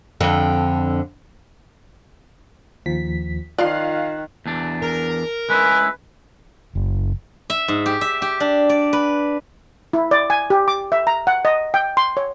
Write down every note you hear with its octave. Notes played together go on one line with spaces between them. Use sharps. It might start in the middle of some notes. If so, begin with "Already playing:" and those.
F2 D3
D#2 F3 B6
D#3 F3 F4 D5 F5 F#6
E2 D4
A#4
G#3 C#4 E4 B4
F#1
E5
G#2
G4
E5
G4
D4
D5
B4
E4
D5
G#5
G4
D6
E5
A#5
F#5
D#5
G5
C6
C#5